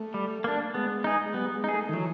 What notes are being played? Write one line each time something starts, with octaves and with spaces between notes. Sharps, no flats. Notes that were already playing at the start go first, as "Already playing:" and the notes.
Already playing: A3
G3
A#3 D4
G#3 B3
D#4 G#4
G#3
G3 B3
G#3
D#4 G#4
A3
D#3
E3 F#3